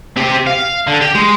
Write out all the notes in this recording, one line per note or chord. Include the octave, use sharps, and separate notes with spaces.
C4 G4
F5
D3
G4
G#3